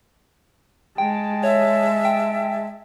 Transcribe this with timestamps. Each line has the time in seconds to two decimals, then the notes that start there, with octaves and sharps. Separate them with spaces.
0.98 G#3 G5 A5
1.43 C#5 E5
2.05 G5